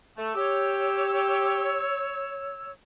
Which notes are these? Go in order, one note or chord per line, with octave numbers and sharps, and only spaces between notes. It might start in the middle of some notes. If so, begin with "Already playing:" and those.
A3
G4 C#5 E6